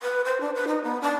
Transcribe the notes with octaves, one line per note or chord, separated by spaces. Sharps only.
B4
C5
D4
B4
D#4
B3
D4